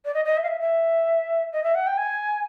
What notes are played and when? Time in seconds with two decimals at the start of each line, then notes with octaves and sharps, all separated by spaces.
0.05 D5
0.14 D#5
0.25 D#5
0.37 E5
0.43 F5
0.48 E5
0.60 E5
1.53 D#5
1.63 E5
1.75 F#5
1.87 G5
1.97 G#5